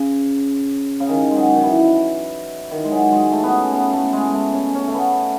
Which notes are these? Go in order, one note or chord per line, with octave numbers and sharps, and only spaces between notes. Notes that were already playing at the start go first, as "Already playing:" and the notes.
Already playing: C#3
C#3
D#3
G#3
F#3
D#3
E3
D#3
G#3
F#3
G#3
A3
B3
C#4
B3
A3
G#3
A3
C#4
C#4
A3
B3